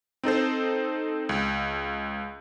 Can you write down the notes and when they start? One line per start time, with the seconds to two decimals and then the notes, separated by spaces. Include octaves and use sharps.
0.24 C4 D#4 A4 C5
1.29 C#2